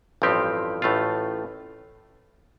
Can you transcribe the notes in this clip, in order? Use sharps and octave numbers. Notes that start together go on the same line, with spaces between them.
A1 G2 F3 C4 G4
A1 A2 A3 F4